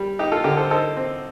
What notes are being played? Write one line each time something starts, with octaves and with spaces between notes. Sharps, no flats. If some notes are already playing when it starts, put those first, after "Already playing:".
Already playing: G3
D#4 G4
F4 A4
D3 G4 A#4
A4 C5
D#4 A4 C5
C4